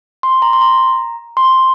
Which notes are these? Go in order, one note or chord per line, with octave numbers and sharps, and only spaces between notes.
C6
A#5
C6
A#5
C6